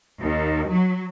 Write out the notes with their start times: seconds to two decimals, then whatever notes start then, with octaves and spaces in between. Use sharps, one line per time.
0.21 D#2
0.69 F#3